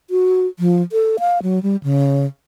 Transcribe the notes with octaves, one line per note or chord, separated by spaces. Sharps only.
F#4
F3
A4
F5
F#3
G3
C#3